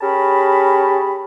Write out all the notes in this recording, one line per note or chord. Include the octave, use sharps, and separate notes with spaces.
C#4 G4 G#4 A#4 A5 B5